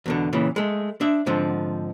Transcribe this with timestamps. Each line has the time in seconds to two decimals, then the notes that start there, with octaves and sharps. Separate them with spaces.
0.06 E2 B2 D3
0.33 A#2 C#3 E3
0.56 G#3 A3
1.01 D4 E5
1.26 G#2 D3 F3 C4